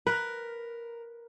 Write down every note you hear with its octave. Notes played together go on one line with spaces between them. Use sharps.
A#4 B4